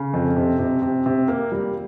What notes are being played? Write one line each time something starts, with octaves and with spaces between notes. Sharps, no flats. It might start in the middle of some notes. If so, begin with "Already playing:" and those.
Already playing: C#3
F2
C3
C3
C3
C3
A#3
G3